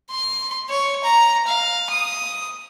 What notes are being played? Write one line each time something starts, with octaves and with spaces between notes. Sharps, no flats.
C6
C#5
A#5
F5
D#6